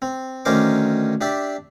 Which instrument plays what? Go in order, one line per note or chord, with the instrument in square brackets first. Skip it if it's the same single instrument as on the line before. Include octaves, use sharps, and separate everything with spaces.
[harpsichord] C4
D2 D#3 C#4 A#4 C5 D6
D4 G4 D5 E5